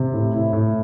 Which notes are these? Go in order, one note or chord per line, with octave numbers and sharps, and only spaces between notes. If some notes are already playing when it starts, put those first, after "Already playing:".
Already playing: C3
A2
E4
A2